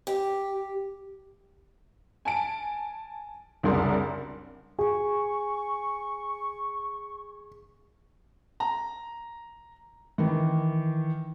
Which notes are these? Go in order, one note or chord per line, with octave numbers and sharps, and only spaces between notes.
G4
G#5 A5 D7
C2 F#2 C#3 D4 A#4 C6
G#4 C#6
A#5
D#3 E3